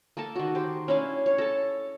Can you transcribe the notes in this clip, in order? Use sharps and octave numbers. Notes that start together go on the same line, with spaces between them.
A#3 A4 A#4 A5
D#3 F#4
G4 C5
C#4 D4 E4 F5
C#5
A4 A5